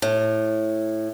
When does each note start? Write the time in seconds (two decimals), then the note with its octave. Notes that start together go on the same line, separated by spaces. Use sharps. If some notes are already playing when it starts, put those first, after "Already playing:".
0.02 A2